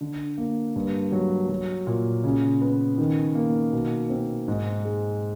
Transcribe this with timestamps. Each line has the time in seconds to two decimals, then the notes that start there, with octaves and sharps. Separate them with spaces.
0.01 D3
0.38 A#3
0.76 G2
1.12 F#3
1.49 F#3
1.87 A#2
2.24 C#3
2.62 B3
2.98 D#3
3.35 A#3
3.73 B2
4.10 C4
4.48 G#2
4.85 G#3